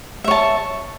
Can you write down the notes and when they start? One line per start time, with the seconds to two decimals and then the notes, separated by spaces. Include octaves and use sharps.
0.24 E5
0.28 C#5
0.31 A5